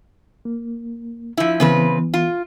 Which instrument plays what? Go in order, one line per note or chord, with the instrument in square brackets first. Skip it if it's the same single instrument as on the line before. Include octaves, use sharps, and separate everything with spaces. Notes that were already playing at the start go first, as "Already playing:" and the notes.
[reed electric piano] A#3
[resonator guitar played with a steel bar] F3 E4
[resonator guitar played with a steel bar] C#3 C4 B4 [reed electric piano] E3 B3
[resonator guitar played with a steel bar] F4